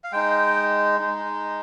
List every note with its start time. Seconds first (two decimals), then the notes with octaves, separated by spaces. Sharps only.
0.04 F5
0.12 G#3 D#4 G5
1.00 G#3 D#4